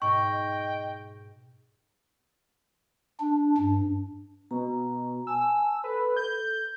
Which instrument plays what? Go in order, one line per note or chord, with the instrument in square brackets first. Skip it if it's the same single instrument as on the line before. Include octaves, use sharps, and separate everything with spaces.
[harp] G#2 B2 [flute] D#5 [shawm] G5 [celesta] C#6
[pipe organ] D4
G2
[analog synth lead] B2 [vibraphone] A#5
[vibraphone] G#5 A5 [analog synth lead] E6
[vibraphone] A4 [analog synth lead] B4
[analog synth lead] G6